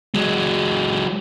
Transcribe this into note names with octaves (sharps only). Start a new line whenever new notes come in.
F#3 G#3